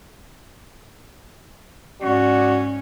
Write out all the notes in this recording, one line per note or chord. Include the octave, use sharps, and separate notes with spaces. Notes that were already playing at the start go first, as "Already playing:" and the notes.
G#2 C#4 F#4 D5